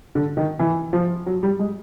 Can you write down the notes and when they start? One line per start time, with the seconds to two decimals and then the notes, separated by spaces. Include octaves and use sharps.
0.15 D3
0.37 D#3
0.59 E3
0.93 F3
1.26 F#3
1.43 G3
1.59 G#3